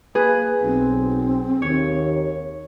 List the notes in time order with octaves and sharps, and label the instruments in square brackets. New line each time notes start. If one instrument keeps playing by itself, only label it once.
[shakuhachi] A#3 [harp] G#4 [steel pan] B4
[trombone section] B1 [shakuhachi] C4
[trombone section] D#2 [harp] C#5